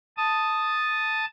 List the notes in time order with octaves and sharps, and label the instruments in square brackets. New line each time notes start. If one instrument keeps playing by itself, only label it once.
[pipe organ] A5 D#6